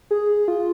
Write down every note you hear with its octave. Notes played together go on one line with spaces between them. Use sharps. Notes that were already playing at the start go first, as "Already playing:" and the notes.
G#4
F4